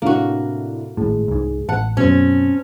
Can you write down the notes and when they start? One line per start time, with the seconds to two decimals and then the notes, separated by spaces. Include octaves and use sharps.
0.02 A2 C3 A#3 D4 F#4
0.97 G#1 A2 G#3
1.28 C2 G#2
1.69 A1 F#5 A5
1.97 F#2 B2 C4 C#4